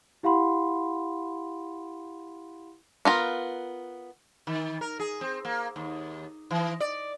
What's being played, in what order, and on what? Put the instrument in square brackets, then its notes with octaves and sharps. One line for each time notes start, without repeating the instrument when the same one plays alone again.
[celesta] E4 G4 F5 F#5 B5 C6
[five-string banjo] B3 F4 A#4
[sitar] D#3
A#4
G#4
C4
A#3
D#2
E3
D5